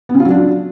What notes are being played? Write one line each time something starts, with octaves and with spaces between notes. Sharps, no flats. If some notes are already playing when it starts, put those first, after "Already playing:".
B3
C#3
F4
F#3
D4